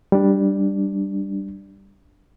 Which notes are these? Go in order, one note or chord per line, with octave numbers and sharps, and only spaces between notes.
G3 D4